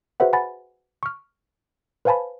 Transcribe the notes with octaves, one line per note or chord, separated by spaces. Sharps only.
F#4 G#4 B4 C5 E5 F#5
F#5 G#5 B5 A6
C#6 F6
B4 C5 F5 G#5 A5 B5